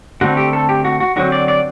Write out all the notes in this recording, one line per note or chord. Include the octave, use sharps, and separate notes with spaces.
D3 A3 C4 F#4
G4
A4
G4
F#4
F#4
D3 F#3 C4 F#4
D5
D5